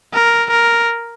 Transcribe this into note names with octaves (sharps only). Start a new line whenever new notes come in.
A#4
A#4